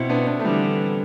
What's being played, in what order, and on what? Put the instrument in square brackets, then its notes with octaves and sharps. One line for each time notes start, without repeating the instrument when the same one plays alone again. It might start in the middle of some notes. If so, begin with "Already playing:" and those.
Already playing: [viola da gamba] B2 [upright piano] C4 E4
[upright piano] B3 D4
B3 D4
A3
[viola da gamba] D3 [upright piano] E3 G3